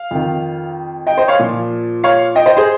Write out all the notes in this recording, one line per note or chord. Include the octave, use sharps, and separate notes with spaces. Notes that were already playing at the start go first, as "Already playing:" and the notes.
Already playing: F5
F2 D#3
D#5 G5
C5 D#5
C#5 F5
A#2 F3
C#5 F5
D#5 G5
C5 D#5
G#4 C5